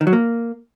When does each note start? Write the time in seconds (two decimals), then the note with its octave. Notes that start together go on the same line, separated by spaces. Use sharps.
0.01 D#3
0.07 F#3
0.13 A#3